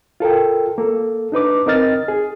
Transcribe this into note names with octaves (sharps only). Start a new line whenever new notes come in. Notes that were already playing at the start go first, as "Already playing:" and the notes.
F4 A4 A#4 G5
A#3 A4
D4 D#4 B4 D6
C4 D#4 A#4 D#5 F6 A6
G#4